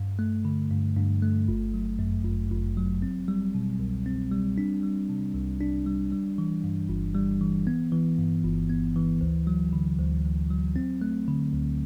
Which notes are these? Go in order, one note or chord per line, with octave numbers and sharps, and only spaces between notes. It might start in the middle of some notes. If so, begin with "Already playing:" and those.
Already playing: G2
A3
D3
G2
G2
A3
G1
F#3
F#2
G1
G1
F#3
C4
G3
B2
C2
C4
G3
D4
G3
C3
C2
D4
G3
G3
E3
G2
G1
G3
E3
B3
E3
G2
G1
B3
E3
D2
F#3
D3
D2
D2
F#3
C4
A3
D3
D2